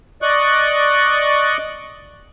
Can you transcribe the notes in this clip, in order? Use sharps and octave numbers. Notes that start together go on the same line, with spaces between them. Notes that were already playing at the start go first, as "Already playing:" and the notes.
D5 D#5 C#6 F#6